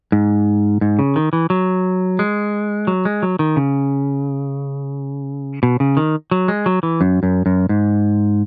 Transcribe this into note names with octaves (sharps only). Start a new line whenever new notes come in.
G#2
G#2
C#3
D#3
E3
F#3
G#3
F#3
G#3
F#3
D#3
C#3
B2
C#3
D#3
F#3
G#3
F#3
E3
F#2
F#2
F#2
G#2